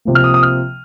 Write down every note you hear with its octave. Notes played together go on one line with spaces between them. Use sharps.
C3 F3 A#3
F6
D#6
D#6
F6